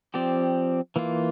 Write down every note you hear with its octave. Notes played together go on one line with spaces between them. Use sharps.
F3 C4 G4 D5
E3 A#3 F4